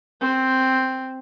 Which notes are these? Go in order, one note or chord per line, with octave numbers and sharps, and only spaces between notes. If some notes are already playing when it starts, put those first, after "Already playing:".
C4